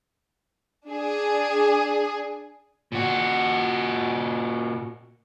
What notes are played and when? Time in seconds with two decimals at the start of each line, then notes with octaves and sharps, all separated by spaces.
0.87 D4 G#4
2.92 A#2 F#4